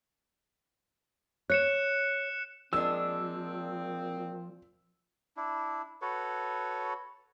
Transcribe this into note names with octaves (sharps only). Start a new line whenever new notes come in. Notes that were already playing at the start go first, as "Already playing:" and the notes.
C#5 F#6 C#7 E7
A#2 F3 G#3 C4 D4 E6
D4 E4
F#4 A4 B4 C#5